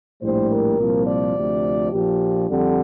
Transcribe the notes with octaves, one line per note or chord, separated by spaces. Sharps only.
A#1 A2 G3 C5
A#4
C2 A#2 F3
D5
D2 C3 F3
A#1 A#2 F3 G4
F2 D3 G3